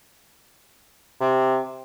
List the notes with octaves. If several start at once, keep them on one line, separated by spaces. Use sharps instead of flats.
C3